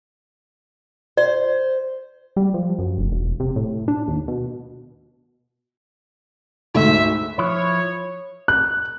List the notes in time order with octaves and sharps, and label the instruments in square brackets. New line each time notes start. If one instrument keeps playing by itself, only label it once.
[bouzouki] C5 [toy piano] D5
[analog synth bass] G3
F3
F#2
F1
E1
C3
A2
D4
D#2
B2
[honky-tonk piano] D2 G#2 A3 [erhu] E5
[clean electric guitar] F3 E4 B4 [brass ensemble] C#5
[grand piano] F#6